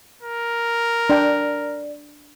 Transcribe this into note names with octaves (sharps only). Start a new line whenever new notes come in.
A#4
D4 D5 G5